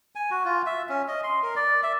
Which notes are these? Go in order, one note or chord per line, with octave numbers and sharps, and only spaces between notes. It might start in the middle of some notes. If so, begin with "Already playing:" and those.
G#5
F#4
F4
E5
C#4
D#5
C6
A#4
D5
E5